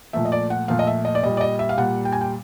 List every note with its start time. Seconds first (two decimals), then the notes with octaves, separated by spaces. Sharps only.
0.13 A#2 F3 A3 E5
0.25 D#5
0.32 D5
0.50 F#5
0.68 A#2 F3 A3 F5
0.79 D#5
0.87 E5
1.05 D#5
1.15 D5
1.23 A#2 G3 D#5
1.37 D5
1.41 D#5
1.59 E5
1.69 F5
1.78 A#2 G3 F#5
2.05 G5
2.12 G#5
2.21 G5